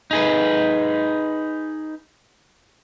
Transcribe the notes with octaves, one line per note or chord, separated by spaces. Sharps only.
D#4 G#4 B4